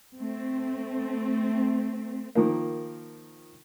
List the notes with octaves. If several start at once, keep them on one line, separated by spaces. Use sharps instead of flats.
A3 C4
D#3 F3 A#3